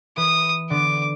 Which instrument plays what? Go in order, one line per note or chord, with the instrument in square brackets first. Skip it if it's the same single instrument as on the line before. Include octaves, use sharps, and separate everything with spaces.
[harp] E3 B4 [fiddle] D#6
[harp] D3 B3 [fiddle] D6